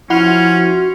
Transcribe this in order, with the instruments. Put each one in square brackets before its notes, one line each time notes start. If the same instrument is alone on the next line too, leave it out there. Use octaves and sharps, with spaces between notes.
[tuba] F3 [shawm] C#4 [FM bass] E4 [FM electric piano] F#4 C6 F6